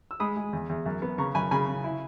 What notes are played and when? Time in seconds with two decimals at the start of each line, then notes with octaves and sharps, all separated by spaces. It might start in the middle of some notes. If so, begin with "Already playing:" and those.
0.11 E6
0.20 G#3 B5 D#6
0.36 G#3
0.53 E2
0.69 E2
0.85 F#2
1.02 B3
1.18 C#3 A#5 C#6
1.35 F#2 G#5 B5
1.51 C#3 G#5 B5
1.68 C#3
1.84 E4